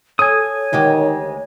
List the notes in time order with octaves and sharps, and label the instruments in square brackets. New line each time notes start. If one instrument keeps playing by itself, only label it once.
[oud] A4 [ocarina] C#5 [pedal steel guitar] G#5 D#6
[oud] D2 G#3 G4 [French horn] D#3